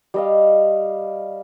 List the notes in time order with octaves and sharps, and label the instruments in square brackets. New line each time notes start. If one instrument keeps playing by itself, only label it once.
[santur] G3 D#5 F5